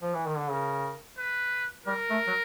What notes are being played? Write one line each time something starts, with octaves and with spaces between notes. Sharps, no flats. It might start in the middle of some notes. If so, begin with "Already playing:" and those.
F3
E3
D#3
D3
C#3 A#4
B4
G3 A#4
A3
F#3